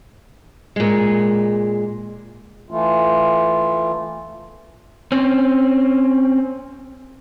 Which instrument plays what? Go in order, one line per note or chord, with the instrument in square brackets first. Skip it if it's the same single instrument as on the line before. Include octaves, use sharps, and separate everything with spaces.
[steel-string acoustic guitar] A#2 G#3
[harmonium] E3 A3 F4
[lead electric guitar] C4 C#4